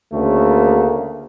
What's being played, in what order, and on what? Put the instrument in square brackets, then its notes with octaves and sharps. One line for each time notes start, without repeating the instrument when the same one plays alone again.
[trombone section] D2 C#3 A3 A#3